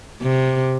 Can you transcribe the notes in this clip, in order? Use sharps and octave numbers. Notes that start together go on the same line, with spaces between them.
C3